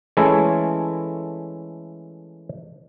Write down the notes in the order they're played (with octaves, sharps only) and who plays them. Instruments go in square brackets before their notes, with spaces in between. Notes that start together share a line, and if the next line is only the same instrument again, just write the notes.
[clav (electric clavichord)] E3 G#3 A3 C#4 E4 A4